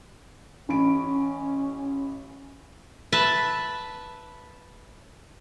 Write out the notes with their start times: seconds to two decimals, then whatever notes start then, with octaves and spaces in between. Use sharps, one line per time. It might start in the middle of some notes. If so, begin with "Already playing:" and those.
0.69 A1 C#4 B5 D7
3.12 B4 E5 A5